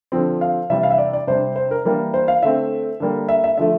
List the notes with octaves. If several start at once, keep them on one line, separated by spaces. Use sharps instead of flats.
D3 F3 C4
F5
C3 E3 G3 E5
F5
E5
D5
D5
C3 G3 D4 C5
C5
A#4
E3 G3 A#3 D4 A#4
C5
F5
D3 A3 C4 E5
D3 G3 A#3
E5
E5
D3 F3 A3 E5